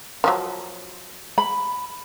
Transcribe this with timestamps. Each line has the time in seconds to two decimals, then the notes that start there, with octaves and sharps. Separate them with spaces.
0.24 D#3 F3 F#3
1.38 B5